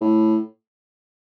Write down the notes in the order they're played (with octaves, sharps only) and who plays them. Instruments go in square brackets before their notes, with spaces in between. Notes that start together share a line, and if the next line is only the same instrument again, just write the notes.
[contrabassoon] A2